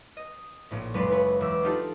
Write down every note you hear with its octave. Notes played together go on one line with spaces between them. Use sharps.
D#5
A#1 A2
F#1 G#3 B4 D5 C6
E4 B4 C#5
E1 E5 D6 E6
D4 D#4 F4 G4 A4 D5